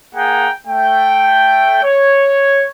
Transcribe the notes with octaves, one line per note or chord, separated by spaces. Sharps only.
A#3 G#4 F#5 G5 A#5
A3 G5
C#5